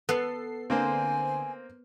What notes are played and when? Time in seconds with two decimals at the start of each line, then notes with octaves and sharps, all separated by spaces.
0.09 B3 A4 C7
0.70 D3 A#3 C4 C5 G#5